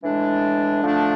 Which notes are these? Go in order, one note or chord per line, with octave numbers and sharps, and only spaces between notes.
A2 E3 G#3 D4
D3 F3 A3 D4